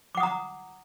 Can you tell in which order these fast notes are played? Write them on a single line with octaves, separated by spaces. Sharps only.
D6 F#5 D#6 A#5